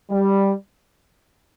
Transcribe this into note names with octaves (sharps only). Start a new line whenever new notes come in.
G3